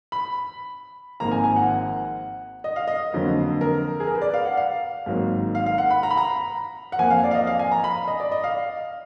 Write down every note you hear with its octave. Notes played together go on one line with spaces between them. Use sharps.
B5
G#1 G#2 F3 A#3 A#5
G#5
G#5
F#5
D#5
F5
D#5
F2 D3 F#3 A#3
A#4
G#4
A#4
B4
D5
F5
F#5
F5
G#1 G#2 F#3 A#3
F5
F5
F#5
B5
A#5
B5
A#5
F#5
F2 F3 A#3 G#5
F5
D5
F5
D#5
F5
G#5
A#5
B5
D#5
D5
D#5
F5